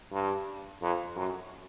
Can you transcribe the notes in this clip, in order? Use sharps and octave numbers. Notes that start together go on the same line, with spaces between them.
G2
F2
F#2